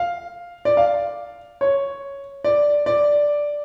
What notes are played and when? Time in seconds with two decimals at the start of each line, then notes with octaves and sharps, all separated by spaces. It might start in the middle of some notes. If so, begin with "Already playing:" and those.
Already playing: F5
0.65 D5
0.77 F5
1.61 C#5
2.44 D5
2.86 D5